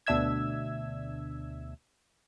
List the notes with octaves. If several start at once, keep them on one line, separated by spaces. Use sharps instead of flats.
D2 B2 D4 E5 E6 G#6